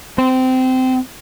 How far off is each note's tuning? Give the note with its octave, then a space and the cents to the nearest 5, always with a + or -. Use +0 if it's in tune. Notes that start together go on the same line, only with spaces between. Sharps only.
C4 -20